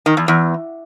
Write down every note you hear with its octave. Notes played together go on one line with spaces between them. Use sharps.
D#3
E2
E2